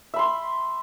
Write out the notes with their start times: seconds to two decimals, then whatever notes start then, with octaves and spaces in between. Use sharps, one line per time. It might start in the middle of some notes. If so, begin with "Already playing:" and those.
0.14 E5
0.16 B5
0.19 C6